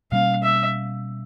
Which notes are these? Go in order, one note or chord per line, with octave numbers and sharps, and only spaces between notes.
B2 G3 A#3 C#4 F5
E5